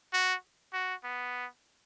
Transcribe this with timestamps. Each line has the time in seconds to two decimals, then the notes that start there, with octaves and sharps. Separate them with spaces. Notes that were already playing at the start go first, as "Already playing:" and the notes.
0.13 F#4
0.73 F#4
1.04 B3